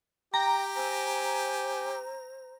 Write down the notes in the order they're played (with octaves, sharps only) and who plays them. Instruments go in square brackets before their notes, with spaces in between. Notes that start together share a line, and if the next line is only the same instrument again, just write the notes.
[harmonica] G4 [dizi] G5 [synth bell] A#5
[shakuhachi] C5 [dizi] G#5